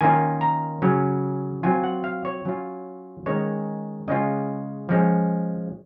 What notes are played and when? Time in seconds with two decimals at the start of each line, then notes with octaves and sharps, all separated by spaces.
0.01 D#3 A#3 C#4 F4 G#5
0.41 A#5
0.82 C#3 F#3 C#4
1.63 F#3 C4 F4 G#5
1.84 F#5
2.04 F5
2.25 C#5
2.45 F#3 C#4 F4
3.26 D#3 G#3 C#4 C#5
4.08 C#3 G#3 C#4 F4 D#5
4.89 F3 G#3 C#4